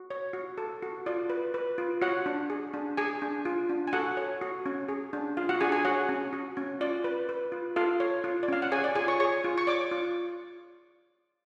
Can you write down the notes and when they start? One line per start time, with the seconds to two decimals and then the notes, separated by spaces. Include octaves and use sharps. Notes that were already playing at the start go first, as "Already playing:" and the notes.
Already playing: F#4
0.10 C#5
0.33 F#4
0.58 A4
0.82 F#4
1.06 F4 D5
1.30 B4
1.54 B4
1.78 F4
2.02 F#4 C#5 F#5
2.26 D4
2.50 G#4
2.74 D4
2.97 G#4 G#5
3.22 D4
3.45 F4
3.69 D4
3.87 G#5
3.93 F#4 A4 F#5
4.17 C#5
4.42 F#4
4.66 C#4
4.88 G#4
5.13 D4
5.37 F4 F5
5.49 F#4 F#5
5.60 D4 G#4 G#5
5.72 G#4 G#5
5.85 F#4 C#5 F#5
6.09 C#4
6.33 F#4
6.57 C#4
6.81 F4 D5
7.04 B4
7.29 B4
7.52 F4
7.76 F4 A4 F5
8.00 C#5
8.24 F4
8.43 D5
8.48 C#4 F5
8.62 F#5
8.72 G#4 C#5 G#5
8.84 D5
8.95 F4 G#4 G#5
9.08 C#5 C#6
9.20 G#4 C#5 C#6
9.44 F4
9.58 C#6
9.67 C#5 D5 D6
9.92 F4